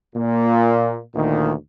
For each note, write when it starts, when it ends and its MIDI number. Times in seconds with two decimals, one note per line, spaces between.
0.15 1.01 46
1.14 1.53 38
1.14 1.53 46
1.14 1.53 51